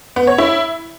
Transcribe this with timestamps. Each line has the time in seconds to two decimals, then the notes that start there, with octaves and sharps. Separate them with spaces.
0.16 B3
0.27 C#5
0.38 E4